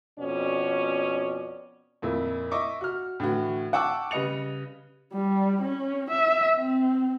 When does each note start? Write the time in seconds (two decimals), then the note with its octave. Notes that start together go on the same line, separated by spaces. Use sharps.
0.19 F2 B2 C#4 D5
2.02 F2 A#2 E4
2.51 D#5 E5 C#6 D6
2.81 F#4 F6
3.20 A2 D3 E3 F#4
3.73 F#5 G5 A5 C#6 D6 E6
4.11 C#3 G3 B4 D#5 C#7 F7
5.13 G3
5.62 C#4
6.11 E5
6.57 C4